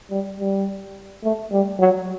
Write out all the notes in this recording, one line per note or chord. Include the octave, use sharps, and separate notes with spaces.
G3
G3
A3
G3
F#3